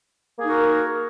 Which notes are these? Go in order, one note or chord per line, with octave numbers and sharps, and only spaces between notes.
A#3 D#4 F#4 G#4 A#4